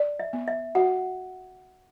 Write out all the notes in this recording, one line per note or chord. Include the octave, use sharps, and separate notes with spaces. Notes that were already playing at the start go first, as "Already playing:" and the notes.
Already playing: D5
E5
B3
E5
F#4 F#5